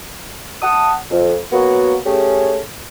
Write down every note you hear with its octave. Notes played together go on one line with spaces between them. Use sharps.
E5 F#5 A5 D#6
F2
F#3 A#3 B3 F#4
A3 C#4 G4 G#4